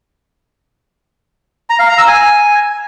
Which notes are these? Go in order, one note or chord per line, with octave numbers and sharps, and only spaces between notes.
A#5
F5
A#5
E6
G#5